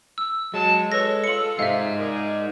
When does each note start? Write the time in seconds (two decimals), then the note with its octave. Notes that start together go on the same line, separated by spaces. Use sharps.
0.18 E6
0.54 F#3 G#3 A5
0.92 A4 B4 C#5 A#6
1.24 F4 C#7 F#7
1.59 C3 G#3 D#4 E5 F5
1.98 G#4 A#4 D5